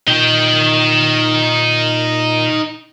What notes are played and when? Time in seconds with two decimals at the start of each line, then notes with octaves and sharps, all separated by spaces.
0.08 A#2 D#4 G5